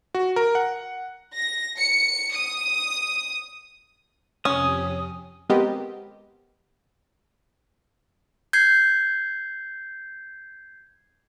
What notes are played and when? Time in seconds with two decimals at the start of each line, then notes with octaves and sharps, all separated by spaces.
0.15 F#4
0.36 A#4
0.55 F#5
1.34 A#6
1.78 C#7
2.34 D#6
4.45 F2 C3 C#4 G4 D#6
5.49 G#3 B3 C4 G4 A#4 D#5
8.53 G6 G#6 C7